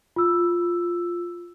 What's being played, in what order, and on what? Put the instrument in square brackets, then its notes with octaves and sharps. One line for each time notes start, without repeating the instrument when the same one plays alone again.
[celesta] F4 E6